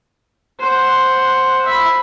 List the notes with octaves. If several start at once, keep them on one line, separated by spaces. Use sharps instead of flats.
C5 F#5
E5 B5